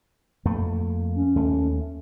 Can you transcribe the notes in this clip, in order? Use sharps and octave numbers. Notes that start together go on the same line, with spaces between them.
F2 A3 A#3
C#4
D#2 A3